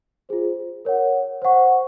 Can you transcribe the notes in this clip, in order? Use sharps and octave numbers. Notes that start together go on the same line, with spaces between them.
F4 G#4 C5
A#4 C#5 F#5
C5 F#5 C#6